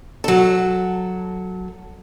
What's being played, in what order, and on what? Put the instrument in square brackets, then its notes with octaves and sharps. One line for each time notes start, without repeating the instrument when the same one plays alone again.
[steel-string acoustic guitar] F#3 A4